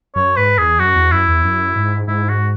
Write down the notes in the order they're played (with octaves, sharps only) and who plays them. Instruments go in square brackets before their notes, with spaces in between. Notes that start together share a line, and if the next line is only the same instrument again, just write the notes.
[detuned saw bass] F#2 [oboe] C#5
[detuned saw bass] G#2 [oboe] B4
[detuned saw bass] E2 [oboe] G#4
[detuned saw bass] F#2 [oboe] F#4
[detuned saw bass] E2
[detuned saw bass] F#2 [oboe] E4
[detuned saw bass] E2
F#2
G#2
[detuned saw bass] G#2 [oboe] E4
[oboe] F#4